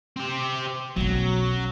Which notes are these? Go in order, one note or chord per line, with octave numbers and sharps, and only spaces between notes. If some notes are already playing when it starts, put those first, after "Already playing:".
C4 G4
B1 F#3 C#4